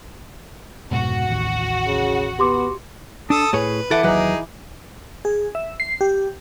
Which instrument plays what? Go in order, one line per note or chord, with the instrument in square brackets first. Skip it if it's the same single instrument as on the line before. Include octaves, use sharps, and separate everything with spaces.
[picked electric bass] F1 G#2 B2 [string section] F#4
[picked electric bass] A1 D#2
[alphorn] C#3
[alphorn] B3 [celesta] G4 C6 D6
[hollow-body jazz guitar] D4 [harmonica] A4 A5 D#6
[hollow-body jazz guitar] A2 G#4 C#5 [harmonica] B4
[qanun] E3 F#5 D6 [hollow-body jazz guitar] A4
[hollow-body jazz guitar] D#2 F#3 B4 [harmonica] D#4 G#4
[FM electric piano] G#4
E5
C7
G4